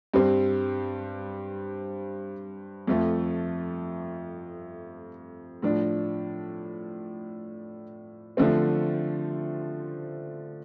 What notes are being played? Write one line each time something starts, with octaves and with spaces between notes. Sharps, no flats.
G2 G3 C4
F2 F3 A3
A2 F3 D4
D3 F3 A3 C4